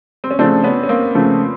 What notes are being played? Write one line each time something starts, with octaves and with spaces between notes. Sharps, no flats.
C4
C#4
C#3 F3 A3 C4 D4
B3 C#4
C#4
A#3 C4
C#3 F3 A3